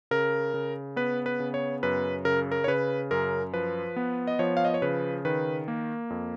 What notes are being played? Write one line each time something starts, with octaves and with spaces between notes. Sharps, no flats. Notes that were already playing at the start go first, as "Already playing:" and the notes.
C#3 A#4
C#3
B3 B4
B4
C#3
C#5
F#2 B4
C#3 A#4
A#4
C#5
C#3 B4
F#2 A#4
F3 B4
B3
D#5
F3 C#5
F5
D#5
C#5
C#3 B4
D#3 B4
A#3
F2